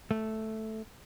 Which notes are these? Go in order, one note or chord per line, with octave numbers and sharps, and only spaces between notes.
A3